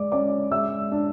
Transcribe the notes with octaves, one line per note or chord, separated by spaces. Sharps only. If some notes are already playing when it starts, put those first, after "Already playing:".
Already playing: G#3 D5 D6
C#4 D5 D6
G#3 E5 E6
D4